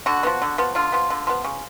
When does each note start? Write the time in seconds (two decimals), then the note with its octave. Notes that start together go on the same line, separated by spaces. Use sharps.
0.06 D3 F#4
0.23 F3 B3
0.42 D3
0.58 F3 B3
0.75 D3 F4
0.92 F3 B3
1.10 D3
1.27 F3 B3
1.44 C#3